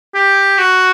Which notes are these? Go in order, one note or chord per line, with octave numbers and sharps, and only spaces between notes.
G4
F#4